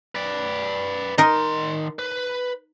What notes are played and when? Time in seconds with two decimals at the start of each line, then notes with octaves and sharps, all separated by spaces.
0.15 B4 D5
1.18 D#3 D#4 A#4 C6
1.99 B4